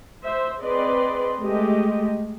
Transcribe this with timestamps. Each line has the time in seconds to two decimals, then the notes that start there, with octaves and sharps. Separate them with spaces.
0.24 C5 E5
0.62 C4 G#4 B4 D5 D#5 C6
1.41 G#3 A3 G4 D#5